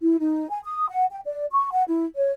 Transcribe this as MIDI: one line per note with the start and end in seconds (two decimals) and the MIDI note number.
0.01 0.16 64
0.19 0.48 63
0.50 0.59 80
0.64 0.87 87
0.89 1.05 78
1.11 1.19 79
1.25 1.45 74
1.52 1.70 85
1.72 1.83 78
1.88 2.05 64
2.16 2.32 73